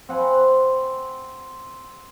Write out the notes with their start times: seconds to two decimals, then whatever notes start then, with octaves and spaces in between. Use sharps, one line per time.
0.09 C4 F#5 G#5 B5